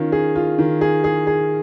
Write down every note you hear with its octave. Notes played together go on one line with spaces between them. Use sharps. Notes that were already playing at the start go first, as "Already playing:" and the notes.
Already playing: D#3 C#4 F4
G#4
F4
D#3
G#4
G#4
G#4